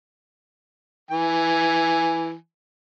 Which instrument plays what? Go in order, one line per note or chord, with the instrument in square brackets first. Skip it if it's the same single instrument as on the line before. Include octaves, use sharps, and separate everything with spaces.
[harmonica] E3 G#5